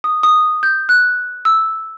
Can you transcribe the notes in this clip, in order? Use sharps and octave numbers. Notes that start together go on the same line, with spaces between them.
D#6
D#6
G6
F#6
E6